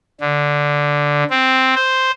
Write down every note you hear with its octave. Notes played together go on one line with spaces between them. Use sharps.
D3
C4
C5